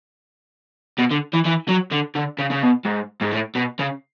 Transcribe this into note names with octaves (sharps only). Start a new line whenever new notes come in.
B2
D3
E3
E3
F#3
D3
D3
C#3
C#3
B2
G#2
G#2
A2
B2
C#3